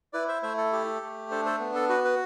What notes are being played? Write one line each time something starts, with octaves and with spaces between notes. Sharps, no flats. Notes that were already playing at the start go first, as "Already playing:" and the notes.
E4 B4 D5
C5 E5
A3 C5 E5
A4
G4
A3
D4 A4 C5
A4 C5
B3
A4
F#4 B4
B4